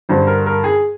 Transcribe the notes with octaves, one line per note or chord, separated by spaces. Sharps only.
G2 D3 G3 C5
A#4
A#4
G#4